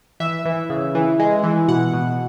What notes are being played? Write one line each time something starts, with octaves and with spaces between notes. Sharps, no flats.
E3 E5
E3
C#3
E3
G#3
E3
B2 F#5
B2